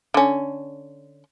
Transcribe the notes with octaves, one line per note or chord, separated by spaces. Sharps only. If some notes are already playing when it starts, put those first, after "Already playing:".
D3 C#4